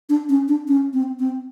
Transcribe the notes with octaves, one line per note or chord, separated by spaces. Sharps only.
D4
C#4
D4
C#4
C4
C4